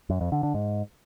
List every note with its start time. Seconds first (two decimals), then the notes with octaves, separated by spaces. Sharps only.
0.10 F#2
0.21 F2
0.32 D3
0.43 D3
0.54 G#2